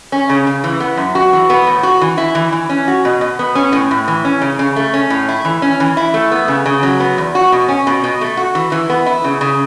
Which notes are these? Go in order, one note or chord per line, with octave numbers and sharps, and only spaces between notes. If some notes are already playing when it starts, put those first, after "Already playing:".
C#4
C#3
C#3
E3
B3
F#2
F#4
E3
B3
A2
F#4
E3
E4
E3
E3
C#4
F#4
B2
B2
B3
C#4
A2
A2
E3
C#4
C#3
C#3
A3
C#4
A2
E4
E3
C#4
E3
E4
A3
B3
C#3
C#3
F#3
B3
E2
F#4
B2
C#4
B2
B2
A3
F#4
E3
E3
B3
E4
C#3
C#3